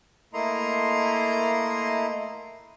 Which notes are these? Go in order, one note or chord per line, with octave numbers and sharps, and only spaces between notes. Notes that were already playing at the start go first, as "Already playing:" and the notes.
A3 A#3 E4 D#5 A#5 C6